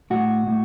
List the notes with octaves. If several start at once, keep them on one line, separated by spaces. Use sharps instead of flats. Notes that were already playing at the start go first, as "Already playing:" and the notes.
A2 F#4
A2